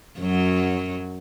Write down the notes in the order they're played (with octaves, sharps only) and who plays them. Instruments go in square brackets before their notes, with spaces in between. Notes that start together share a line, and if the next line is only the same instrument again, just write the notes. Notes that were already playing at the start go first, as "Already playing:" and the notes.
[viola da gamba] F#2 F#3